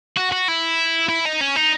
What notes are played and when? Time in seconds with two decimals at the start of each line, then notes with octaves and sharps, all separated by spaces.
0.17 F#4
0.32 F#4
0.48 E4
1.09 E4
1.25 D#4
1.41 C#4
1.56 D#4